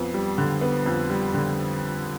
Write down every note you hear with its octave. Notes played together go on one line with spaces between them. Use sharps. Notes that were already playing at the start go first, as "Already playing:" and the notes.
Already playing: F2 B3
G3
D3
B3
F2
G3
D3